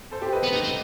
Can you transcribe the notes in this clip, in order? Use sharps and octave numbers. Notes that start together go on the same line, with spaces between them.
A4 C5
G4
B4 D#5
B3
D#4
C4